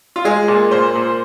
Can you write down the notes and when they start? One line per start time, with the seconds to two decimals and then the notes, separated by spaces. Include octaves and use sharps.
0.16 F4
0.25 G#3 G#4
0.48 A#2
0.71 A#2 C5
0.95 A#2